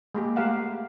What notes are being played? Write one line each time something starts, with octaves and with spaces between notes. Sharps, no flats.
G#3 A#3 G4
A3 G4 A#4 F5 F#5